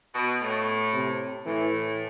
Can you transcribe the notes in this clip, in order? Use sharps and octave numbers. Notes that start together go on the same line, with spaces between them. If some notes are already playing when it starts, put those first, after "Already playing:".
B2
A2
C3
A2 E3